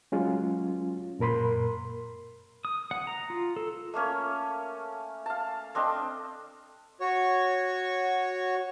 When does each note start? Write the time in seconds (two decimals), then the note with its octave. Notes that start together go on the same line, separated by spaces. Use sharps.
0.12 F#3 G#3 C#4 F4
1.19 F#2 A#2 A#4 B5 C6
2.65 D#6
2.91 F#5
3.07 A#5
3.30 F4
3.56 A4
3.94 A3 A#3 C#4
5.26 F5 A5
5.75 C4 D4 A4 D#5
7.00 F#4 C#5 C#6